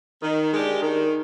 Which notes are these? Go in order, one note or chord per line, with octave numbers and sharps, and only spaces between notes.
D#3
G#3 D4 G4
D#3